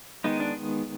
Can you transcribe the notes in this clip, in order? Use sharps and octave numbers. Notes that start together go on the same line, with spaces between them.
D#3 G#3 B3 D#4
D4